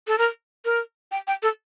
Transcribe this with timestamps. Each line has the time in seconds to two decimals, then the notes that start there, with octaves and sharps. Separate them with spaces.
0.07 A4
0.18 A#4
0.65 A#4
1.12 G5
1.27 G5
1.43 A4